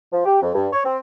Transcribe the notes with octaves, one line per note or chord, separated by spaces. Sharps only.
F3
G4
F2
G2
C#5
C4